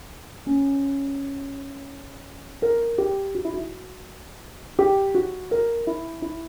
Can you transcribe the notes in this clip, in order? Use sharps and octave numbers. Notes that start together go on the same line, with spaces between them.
C#4
A#4
G4
F#4
E4
F#4
G4
F#4
A#4
E4
E4